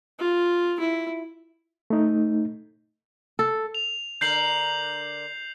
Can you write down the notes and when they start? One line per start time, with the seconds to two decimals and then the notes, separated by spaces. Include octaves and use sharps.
0.19 F4
0.80 E4
1.90 A3 D#4
3.39 A4
3.75 F7
4.21 D3 A#4 G6 C7 F#7